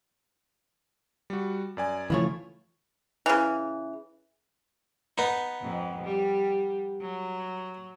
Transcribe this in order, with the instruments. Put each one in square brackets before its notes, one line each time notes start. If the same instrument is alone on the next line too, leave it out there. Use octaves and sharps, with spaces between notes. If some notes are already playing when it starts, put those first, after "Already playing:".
[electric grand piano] G3 F#4
F#2 D5 G#5
[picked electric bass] C#3 F3 A3 [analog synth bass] E3 [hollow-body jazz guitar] E4 F4 C#5
[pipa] C#3 E3
[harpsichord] B3 D#4
[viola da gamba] F2 G#2
G3
F#3